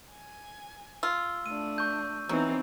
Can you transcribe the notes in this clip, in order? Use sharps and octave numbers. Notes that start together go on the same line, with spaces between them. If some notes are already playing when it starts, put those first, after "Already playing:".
G#5
F4 E6
A3 D4 D#7
C#6 G6
E3 F#3 B3 C4 D#4